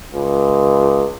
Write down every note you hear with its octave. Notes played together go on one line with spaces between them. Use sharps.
C#2